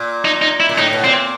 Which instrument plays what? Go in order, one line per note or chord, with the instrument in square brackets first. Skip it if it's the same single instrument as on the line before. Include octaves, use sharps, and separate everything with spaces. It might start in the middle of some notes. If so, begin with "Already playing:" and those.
Already playing: [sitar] A#2
[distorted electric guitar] D#4
D#4
E4
[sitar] A#2
[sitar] A2 [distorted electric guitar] D#4
[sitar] B2
[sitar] A#2 [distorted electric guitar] C4